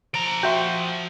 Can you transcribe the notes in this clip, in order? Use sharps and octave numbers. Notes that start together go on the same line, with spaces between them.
F3 A#5 D7
F#4 E5 G5 C6